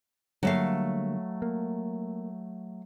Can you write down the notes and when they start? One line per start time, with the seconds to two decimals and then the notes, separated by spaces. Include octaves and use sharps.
0.43 D3 F#3 G3 A3 A#3 F5
1.42 A#3